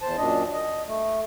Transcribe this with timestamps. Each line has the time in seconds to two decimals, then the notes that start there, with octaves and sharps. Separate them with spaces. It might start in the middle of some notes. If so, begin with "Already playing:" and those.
0.01 E2 C5 A5
0.18 F#2 A#2 D4 D#5
0.53 D#5
0.87 A3